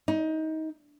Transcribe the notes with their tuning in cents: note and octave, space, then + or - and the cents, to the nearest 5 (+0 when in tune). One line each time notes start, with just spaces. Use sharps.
D#4 +25